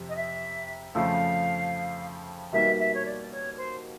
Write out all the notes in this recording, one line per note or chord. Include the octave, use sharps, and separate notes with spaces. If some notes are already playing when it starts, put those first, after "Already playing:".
Already playing: F2 C3
D#5
E5
F2 C#3 F3 A3 F5
B2 G3 A#3 D#4 E5
E5
C#5
D5
C#5
C5